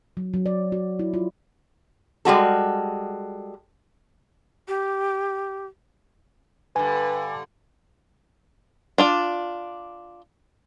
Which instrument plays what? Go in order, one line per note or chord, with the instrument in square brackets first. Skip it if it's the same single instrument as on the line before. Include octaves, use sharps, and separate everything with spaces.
[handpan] F#3
F#3
D5
F#4
E4
F4
[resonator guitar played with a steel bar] G3 G#3 F#4 A4
[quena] G4
[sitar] G2 D3 [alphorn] B4 [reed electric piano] G#5
[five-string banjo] D4 F4 D5